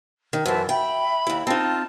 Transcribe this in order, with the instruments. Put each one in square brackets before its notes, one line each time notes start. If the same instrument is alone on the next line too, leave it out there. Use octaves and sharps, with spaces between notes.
[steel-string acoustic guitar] D#3
[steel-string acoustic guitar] F#2 E3 [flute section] B4 C5 A5
[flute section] E5 B5 [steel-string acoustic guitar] G5
[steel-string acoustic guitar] D#2 E4
[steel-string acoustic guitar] C4 D#4 [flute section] F4 A5